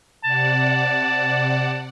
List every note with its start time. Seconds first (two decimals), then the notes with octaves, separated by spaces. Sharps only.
0.24 C3 D5 F#5 A5